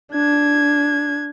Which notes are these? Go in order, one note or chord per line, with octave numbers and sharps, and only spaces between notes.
D4 G#6